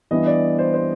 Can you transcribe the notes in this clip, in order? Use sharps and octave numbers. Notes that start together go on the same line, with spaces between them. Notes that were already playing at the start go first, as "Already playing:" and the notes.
E3 G3 B3 D4 D#5
D5
C5
C5